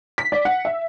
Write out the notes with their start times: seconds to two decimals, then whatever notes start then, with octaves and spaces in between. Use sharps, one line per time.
0.18 B6
0.32 D5
0.45 F#5
0.65 E5